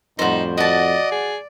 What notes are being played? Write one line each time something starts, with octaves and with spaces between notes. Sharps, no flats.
F2 A2 G3 D#4 F#4 C5
F#4 D5 D#5 A5
G#4